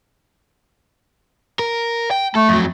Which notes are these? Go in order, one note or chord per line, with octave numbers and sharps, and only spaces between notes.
A#4
G5
A3 A4
F2 F#3